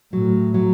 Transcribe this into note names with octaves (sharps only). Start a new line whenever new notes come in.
A2 F#3
F#3